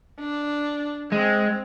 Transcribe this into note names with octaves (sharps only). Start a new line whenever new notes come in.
D4
G#3 C4